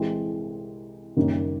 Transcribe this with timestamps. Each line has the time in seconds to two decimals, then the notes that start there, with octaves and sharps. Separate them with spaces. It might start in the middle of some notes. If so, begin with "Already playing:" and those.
Already playing: C2 C3 E3 G#3 C4
1.17 F#1 F#2 D#3 G3 A#3